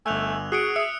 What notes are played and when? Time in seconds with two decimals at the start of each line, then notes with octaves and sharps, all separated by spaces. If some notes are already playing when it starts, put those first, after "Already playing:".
0.06 G1 A3 G#5 E6 F#6 F7
0.52 F#4 G#4 F#6 C#7 D7
0.76 E5 D#6 E6 C#7